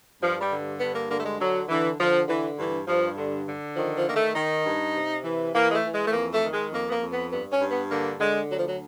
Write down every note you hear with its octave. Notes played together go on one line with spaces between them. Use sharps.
G2 F3
G3
D3
G2 B3
A#3
D3 A#3
A3
G#3
D3 F#3
D3 E3
D3 F3
D3 E3
G2 E3
G2 F3
D3
D3
D#3 F3
F3
D#3 A#3
A3
D#3 D#4
G2
C3
E3
E3 A#3
G#3
A3
E3
G#3
A3
F2 A#3
A3
D#3
G#3
F2 A#3
B3
A#3
F2
B3
G2 B3
C#4
G2
B3
D3 A#3
D3 G#3
D2 F#3
F3
F#3